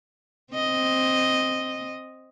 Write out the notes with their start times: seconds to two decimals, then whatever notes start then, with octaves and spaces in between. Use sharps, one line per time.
0.53 C4 D#5